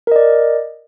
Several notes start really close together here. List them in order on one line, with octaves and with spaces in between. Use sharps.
A#4 D#5 D5